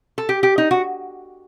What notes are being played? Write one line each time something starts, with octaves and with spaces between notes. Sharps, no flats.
A4
G4
G4
D#4
F#4